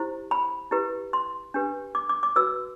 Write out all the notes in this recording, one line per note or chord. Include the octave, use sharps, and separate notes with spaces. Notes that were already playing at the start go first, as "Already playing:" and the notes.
Already playing: E4 G4 C5
B5
E4 G4 B4
C6
D4 G4 B4
D6
D6
D6
F#4 B4 E6